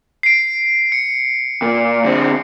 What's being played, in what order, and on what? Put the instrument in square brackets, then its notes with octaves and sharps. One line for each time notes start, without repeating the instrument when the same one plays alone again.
[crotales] C7 D7
C#7
[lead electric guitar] A#2
D3 C4